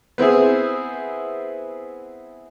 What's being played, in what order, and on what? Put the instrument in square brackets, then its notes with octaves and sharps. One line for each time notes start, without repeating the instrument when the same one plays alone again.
[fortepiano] B3 C4 E4 G#4